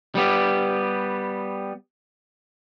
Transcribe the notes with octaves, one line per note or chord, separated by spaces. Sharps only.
G3 B3 G4